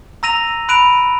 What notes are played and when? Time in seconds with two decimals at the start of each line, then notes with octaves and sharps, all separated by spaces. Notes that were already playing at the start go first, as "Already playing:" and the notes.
0.23 A#5 E6 A#6 D#7 F7
0.69 B5 F#6 D7 D#7 F7